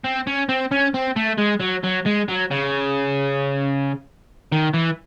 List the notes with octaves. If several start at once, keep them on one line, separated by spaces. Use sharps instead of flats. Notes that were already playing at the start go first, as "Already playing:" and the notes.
C4
C#4
C4
C#4
C4
A3
G#3
F#3
F#3
G#3
F#3
C#3
D#3
E3